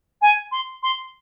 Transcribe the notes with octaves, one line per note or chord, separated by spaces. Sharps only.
G#5
C6
C6